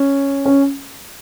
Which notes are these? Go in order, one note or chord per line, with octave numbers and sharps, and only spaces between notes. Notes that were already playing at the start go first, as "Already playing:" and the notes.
Already playing: C#4
C#4